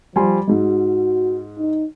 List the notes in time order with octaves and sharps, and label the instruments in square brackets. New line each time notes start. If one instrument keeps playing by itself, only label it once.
[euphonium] F3 [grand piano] G3 G#5 C6
[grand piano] G#2 G#3 [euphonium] F#4
[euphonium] D#4